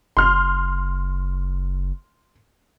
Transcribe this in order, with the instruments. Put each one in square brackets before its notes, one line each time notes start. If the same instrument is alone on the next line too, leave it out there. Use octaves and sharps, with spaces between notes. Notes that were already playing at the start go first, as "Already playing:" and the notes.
[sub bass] F#1 [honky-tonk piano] C6 F6